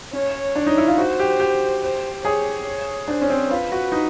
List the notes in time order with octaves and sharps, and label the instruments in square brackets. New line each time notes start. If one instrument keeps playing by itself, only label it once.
[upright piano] C#4 [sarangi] C#5
[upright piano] D4
D#4
E4
F4
[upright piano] F#4 [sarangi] C5
[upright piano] G4
G4
[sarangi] C5
[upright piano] G#4 [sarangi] C#5
[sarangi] C#5
[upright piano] D4 [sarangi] C5
[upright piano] C#4
C4
[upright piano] F4 [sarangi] B4
[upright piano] F#4
D#4